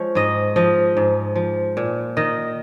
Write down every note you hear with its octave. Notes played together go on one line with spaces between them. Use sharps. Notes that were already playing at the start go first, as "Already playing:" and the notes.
Already playing: F3 G#3 C#5
G#2 D#5
F3 D#5
G#2
F3
A#2
D#3 D#5